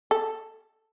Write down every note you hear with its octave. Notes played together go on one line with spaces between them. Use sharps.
A4